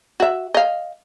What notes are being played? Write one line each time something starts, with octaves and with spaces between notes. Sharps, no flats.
F#4 E5
D#5 F5